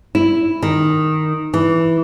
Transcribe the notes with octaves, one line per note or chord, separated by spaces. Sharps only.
E4
D#3
E3